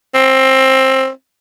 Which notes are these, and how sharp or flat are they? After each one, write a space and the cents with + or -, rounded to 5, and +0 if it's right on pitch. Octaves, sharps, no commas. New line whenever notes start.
C4 +20